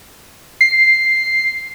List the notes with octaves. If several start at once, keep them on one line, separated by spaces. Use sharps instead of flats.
C7